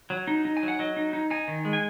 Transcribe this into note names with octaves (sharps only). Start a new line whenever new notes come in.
F#3
D#4
D#4
G#5
F#3
F#5
F#3 D#5
D#4
D#4
D#4 G#5
D#3
G#3
G#5